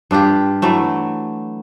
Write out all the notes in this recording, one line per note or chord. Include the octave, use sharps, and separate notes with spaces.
G2 D4 F4 G4
E3 F#3 A3